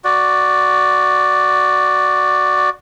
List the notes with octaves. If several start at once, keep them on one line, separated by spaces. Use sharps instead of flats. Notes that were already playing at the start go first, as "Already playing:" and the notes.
F#4 D5